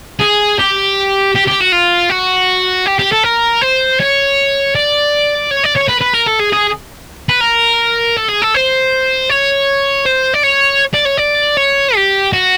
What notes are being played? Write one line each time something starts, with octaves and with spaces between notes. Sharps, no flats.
G#4
G4
G4
G4
F#4
F4
F#4
G4
G4
A4
A#4
C5
C#5
D5
C#5
D5
C#5
B4
B4
A#4
A4
G#4
G#4
B4
A#4
A4
G#4
A4
C5
C#5
C5
D5
C#5
D5
C#5
D5
C#5
G4
F#4